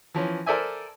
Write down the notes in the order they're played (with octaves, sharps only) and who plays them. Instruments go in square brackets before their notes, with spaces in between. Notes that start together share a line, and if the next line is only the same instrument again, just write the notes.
[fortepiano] E3 F3 C#4
A4 A#4 C5 D5 E5 G#5